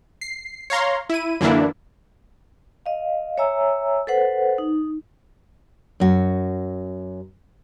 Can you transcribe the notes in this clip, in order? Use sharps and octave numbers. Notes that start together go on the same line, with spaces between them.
C7
C#5 F5 A#5 C6
E4 D#7
F#2 D3 E3 A#3 D4 E4
D#5 F5
C#5 E5 G#5 A#5 E6
A4 B4 C5 F#5
D#4
F#2 F#4